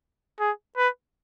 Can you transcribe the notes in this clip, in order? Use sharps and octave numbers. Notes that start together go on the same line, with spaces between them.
G#4
B4